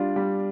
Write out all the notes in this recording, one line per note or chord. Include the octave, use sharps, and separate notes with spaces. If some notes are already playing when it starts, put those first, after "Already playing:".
Already playing: G3 D4 F4
G3